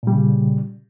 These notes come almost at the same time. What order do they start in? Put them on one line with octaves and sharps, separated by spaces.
A#2 G3 C#3